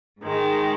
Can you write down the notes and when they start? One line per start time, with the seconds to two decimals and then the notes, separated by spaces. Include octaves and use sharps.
0.20 G#2 D#3 G#3